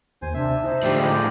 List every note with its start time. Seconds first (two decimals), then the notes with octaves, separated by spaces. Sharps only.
0.22 D#2 C5 G#5
0.34 C3 D4 E5
0.64 D#4 C5
0.83 A2 D3 F3 G4 D5 E5
0.95 D3 G#3 D#4 D5